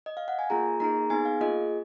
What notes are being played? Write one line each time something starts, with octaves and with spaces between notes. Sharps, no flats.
D#5
F5
F#5
G#5
A#3 F4 G#4 A#5
A#3 D#4 G#4 A#5
B3 D#4 G#4 G#5
F5
A#3 F4 G#4 D#5